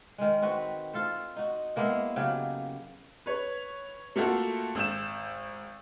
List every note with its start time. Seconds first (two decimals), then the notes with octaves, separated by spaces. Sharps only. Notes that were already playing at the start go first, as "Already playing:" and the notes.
0.18 D#3 G#3
0.42 C4 F#4 B4
0.93 F4 A4 C5
1.36 D#4 F#4
1.76 G#3 A#3 B3 E4
2.16 C#3 F#3 G4
3.26 B4 C#5
4.16 A3 A#3 F4 F#4 A4
4.75 G#1 E6 G6 E7